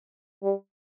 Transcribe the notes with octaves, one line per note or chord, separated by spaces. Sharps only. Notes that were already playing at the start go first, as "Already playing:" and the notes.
G3